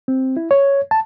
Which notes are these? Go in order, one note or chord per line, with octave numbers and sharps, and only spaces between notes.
C4
E4
C#5
A5